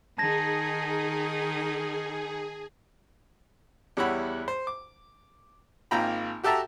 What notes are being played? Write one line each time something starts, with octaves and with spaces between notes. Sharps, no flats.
D#3 D#4 G#4 A5 G#6 A#6
E2 G3 E4 C#5 F#5 B5
C5
D6
G#1 A#3 F4 G5 A#5 B5
F#4 G4 A4 E5 A5 A#5